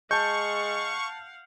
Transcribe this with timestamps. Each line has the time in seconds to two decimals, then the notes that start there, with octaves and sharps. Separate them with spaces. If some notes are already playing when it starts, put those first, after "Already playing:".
0.11 G#3 F5 F#5 A5 C#6 G6